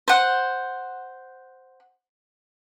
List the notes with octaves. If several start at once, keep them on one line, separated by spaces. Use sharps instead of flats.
C5 F#5